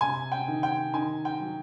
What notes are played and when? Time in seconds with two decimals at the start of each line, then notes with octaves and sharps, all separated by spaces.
0.01 C3 G#5
0.32 G5
0.48 D#3
0.63 G5
0.93 D#3 G#5
1.25 G5
1.40 F#3